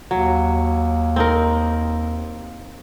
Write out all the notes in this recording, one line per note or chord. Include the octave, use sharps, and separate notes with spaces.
D#2 F#3
C4 D#4 A#4